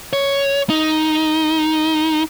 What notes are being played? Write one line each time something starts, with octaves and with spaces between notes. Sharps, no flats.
C#5
D#4